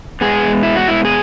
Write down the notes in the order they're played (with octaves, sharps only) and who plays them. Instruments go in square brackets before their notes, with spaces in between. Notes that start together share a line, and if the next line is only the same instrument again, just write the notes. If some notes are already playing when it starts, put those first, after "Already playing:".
[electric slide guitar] B2 G#3 B3 G#4
E4
F#4
E4
G#4